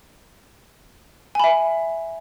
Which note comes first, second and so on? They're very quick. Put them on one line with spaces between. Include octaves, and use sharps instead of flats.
G#5 B5 E5